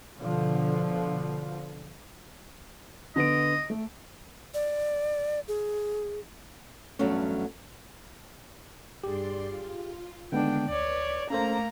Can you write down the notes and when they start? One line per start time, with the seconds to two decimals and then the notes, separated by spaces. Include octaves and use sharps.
0.18 B2 D3 F3
3.16 D3 B3 D#5 D7
3.70 A3
4.54 D5
5.48 G#4
6.99 E2 G2 F#3 A3 C#4
9.04 G2 G4 G#4 D5 C6
9.47 F4
10.32 D3 D#3 G#3 B3 D4 G5
10.69 D2 B4 C#5 D5
11.30 A3 A#3 C#4 A4 C5 A#5